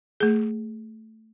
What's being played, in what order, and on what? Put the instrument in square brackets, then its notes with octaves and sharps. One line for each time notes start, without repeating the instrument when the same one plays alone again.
[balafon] A3 G#4